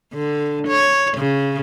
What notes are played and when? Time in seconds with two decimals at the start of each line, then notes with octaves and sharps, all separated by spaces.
0.13 D3
0.67 C#5
1.17 C#3